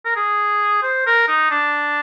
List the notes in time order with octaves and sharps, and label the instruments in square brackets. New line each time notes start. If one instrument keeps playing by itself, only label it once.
[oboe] A#4
G#4
C5
A#4
D#4
D4